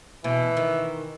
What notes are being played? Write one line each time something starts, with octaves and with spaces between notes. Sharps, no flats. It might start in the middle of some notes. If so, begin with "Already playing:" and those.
B2 E3
D#3